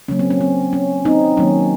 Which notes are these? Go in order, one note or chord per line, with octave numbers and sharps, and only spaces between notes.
C#3 F#3 A#3 C#4
C4
C#4
C4
C#4
C4 D#4
D#3 F#3 A#3 C#4